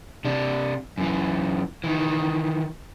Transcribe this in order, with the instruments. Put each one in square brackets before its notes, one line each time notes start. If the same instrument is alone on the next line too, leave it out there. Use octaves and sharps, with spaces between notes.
[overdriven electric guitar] C3 D4
F#2 E3
D#3 E3